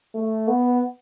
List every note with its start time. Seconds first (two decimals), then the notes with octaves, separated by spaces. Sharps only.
0.14 A3
0.48 B3